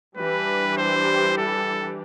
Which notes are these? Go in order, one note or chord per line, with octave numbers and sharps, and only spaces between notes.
E3 G3 D4 G4 B4
C5
A4